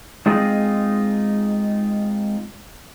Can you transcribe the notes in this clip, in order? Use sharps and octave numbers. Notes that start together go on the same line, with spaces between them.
G#3 C4 D#4 F4 G#4 D#5